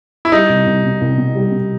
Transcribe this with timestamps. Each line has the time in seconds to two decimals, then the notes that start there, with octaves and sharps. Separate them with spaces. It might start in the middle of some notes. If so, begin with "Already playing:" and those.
0.25 E4
0.32 G3 D#4
0.49 C2
0.67 C2
0.84 B2
1.01 C2
1.18 B2
1.35 G3
1.52 B2